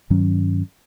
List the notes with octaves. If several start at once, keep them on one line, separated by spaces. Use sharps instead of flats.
G2 D#3 F#3 C#4